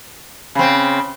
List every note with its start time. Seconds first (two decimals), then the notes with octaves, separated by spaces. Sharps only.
0.55 C#3 C4 B5